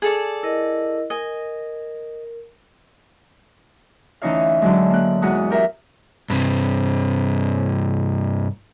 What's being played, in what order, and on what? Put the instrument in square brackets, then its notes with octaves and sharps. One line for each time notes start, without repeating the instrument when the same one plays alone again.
[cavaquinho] G#4 A4 D5
[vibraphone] E4 A#4 D#5
[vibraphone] A#4 [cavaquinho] D#5 G#5
[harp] D2 E3 C#4 D#4 C#5 F5
D3 F#3 G#3
A#3 F#6
E2 G#2 G#3 F#4 F#5 D#6
G4 A#4 E5
[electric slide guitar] G2 C3